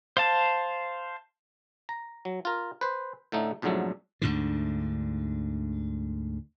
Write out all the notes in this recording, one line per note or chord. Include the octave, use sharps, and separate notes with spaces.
C5 F5 A5
A#5
F#3
F4 A#4
B4 C5
A2 D3 A3 D#4
B1 F2 G#2 D3 F#3 A3
D2 G#2 D3